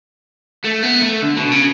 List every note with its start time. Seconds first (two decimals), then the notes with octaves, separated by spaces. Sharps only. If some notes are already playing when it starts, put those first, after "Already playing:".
0.65 A3
0.83 B3
1.02 A3
1.22 D3
1.37 B2
1.52 C#3